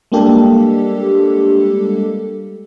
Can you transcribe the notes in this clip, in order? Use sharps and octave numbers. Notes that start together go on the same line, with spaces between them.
G3 G#3 A#3 D4 G4 A4